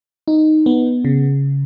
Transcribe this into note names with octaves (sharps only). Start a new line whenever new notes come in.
D#4
B3
C#3